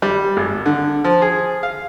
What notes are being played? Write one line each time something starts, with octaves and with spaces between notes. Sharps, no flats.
G3
G#1
D3
F3
G#4
F5